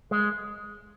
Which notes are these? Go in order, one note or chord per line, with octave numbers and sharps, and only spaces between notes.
G#3